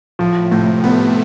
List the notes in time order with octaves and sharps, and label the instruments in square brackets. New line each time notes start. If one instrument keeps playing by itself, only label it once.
[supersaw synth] A2 [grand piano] F3
[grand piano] A2 [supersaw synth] C3
[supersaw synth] A3 [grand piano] B3